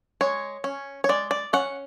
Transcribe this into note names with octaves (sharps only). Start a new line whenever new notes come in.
G#3 C#5
C#4
C#5
G#3 D5
D5
C#4 F#5